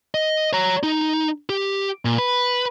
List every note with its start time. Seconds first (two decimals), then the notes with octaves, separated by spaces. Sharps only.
0.15 D#5
0.53 C#5 A#5
0.83 D#4
1.49 G4
2.05 A#2
2.18 B4